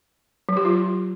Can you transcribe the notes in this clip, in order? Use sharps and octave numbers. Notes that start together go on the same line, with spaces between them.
F#3
G4
F4